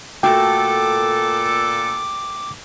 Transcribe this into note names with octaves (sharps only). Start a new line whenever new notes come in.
A#2 A3 F#4 A4 G5 D6